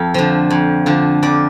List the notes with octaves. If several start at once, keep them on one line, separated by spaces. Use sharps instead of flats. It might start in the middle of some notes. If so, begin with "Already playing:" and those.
Already playing: F2 A4
D3 F3
F2
D3 F3
F2 D5